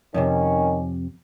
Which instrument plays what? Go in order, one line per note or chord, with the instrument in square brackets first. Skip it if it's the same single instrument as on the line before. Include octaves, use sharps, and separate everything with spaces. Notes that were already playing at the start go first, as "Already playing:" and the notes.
[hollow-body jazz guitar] F2 A2 C3 [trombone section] D#3 C#4